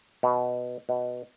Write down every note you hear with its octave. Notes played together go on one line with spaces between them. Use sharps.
B2
B2